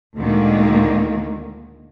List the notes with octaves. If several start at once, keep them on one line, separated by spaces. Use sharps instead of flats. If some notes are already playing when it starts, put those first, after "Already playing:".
D2 A#2 D3 D#3 G#3 A#3